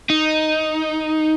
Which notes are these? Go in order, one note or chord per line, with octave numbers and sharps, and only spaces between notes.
D#4